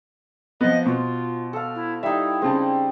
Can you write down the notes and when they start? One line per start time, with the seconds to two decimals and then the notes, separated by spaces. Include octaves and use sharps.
0.61 F3 B3 D#5
0.86 B2 F4 C5
1.53 A4 F5
1.75 E4
2.03 G3 D#4 E4 E5
2.42 C#3 G#3 C4 A5